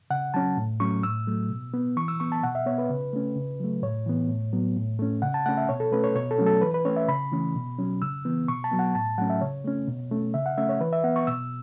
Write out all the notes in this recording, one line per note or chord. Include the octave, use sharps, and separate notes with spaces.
C#3 F#5
F#3 C#4 A5
A2
F#3 A3 C#4 C#6
A2 E6
F#3 A3
B2
B3
E3 C#6
E6
B3 C#6
A5
B2 F#5
E5
B3 C#5
B4
C#3
A3 C#4
C#3
F#3 A3
A2 C#5
E3 B3
A2
F#3 B3
A2
A3 C#4
C#3 F#5
A5
A3 C#4 F#5
E5
B2 C#5
A4
A3 C#4 B4
C#5
B2 C#5
A4
F#3 A3 C#4
A4
E3 B4
B4
A3 C#4 C#5
E5
C#3 B5
E3 A3 C#4
B2
F#3 C#4
C#3 E6
E3 B3
B2 C#6
A5
F#3 B3
F#5
A2 A5
F#3 A3 C#4 F#5
E5
C#3 C#5
A3 C#4
B2
A3 C#4
C#3 E5
F#5
A3 C#4 E5
C#5
E3 B4
E5
B3 F#5
C#6
B2 E6